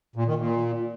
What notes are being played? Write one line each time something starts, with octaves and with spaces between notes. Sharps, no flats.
A#2
D#3
A#2